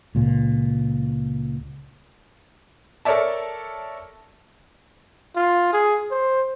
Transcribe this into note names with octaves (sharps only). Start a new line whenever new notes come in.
C#2 A#2
A4 A#4 C#5 D5 E5 A5
F4
G#4
C5